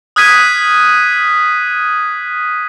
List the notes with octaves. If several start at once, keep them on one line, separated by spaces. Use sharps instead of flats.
D#6 F6 F#6 G#6 B6 D#7